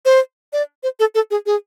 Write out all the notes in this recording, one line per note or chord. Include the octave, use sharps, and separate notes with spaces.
C5
D5
C5
A4
A4
G#4
G#4